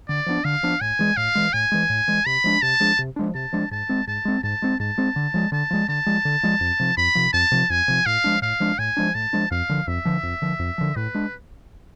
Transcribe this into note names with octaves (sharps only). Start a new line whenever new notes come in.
D3 D5
F3 B3 D4
D3 F5
F3 B3 D4
A2 G#5
E3 G#3
A2 F5
E3 G#3
A2 G#5
E3 G#3
A2
E3 G#3
C3 B5
F3 G#3 D4
C3 A5
F3 G#3 D4
C3
F3 G#3 D4
C3 A5
F3 G#3 D4
G#2 A5
G#3 C4
G#2 A5
G#3 C4
G#2 A5
G#3 C4
G#2 A5
G#3 C4
D3
F3 G#3
D3 A5
F3 G#3
D3 A5
F3 G#3
D3
F3 G#3
F2
C3 F3
F2 B5
C3 F3
F2 A5
C3 F3
F2 G#5
C3 F3
A2 F5
F3 G#3 D4
A2 F5
F3 G#3 D4
A2 G#5
F3 G#3 D4
A2 A5
F3 G#3 D4
F2 F5
D3 F3
F2 E5
D3 F3
F2
D3 F3
F2
D3 F3
A2 B4
G#3 D4